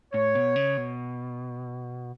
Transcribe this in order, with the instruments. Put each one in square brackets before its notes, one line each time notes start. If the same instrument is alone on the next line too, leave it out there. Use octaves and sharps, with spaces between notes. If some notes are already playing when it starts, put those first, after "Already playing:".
[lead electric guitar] A2 [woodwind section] C#5
[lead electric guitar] B2
C#3
B2